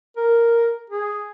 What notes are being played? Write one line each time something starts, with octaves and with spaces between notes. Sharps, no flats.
A#4
G#4